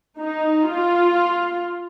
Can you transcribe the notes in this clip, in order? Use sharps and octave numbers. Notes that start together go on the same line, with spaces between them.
D#4
F4